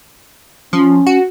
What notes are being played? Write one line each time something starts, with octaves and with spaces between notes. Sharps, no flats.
F3 C#4
F#4